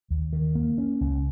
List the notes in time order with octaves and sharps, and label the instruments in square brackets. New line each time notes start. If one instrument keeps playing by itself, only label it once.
[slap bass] D#2
D#3
A#3
C#4
C#2